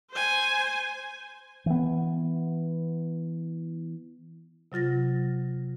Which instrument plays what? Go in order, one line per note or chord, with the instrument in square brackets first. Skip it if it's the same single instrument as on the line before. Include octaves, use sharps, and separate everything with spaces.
[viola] C5 G#5
[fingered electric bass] E3 B3
[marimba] C3 F#3 F4 A6 A#6